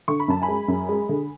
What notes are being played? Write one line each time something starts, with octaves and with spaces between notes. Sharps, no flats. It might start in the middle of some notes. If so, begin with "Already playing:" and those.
D3 C#6
B5
F#2 A5
G#5 B5
G#3
F#2
G#3
D3